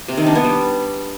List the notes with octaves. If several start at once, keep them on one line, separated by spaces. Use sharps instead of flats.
C3
D#3
D4
B3
G3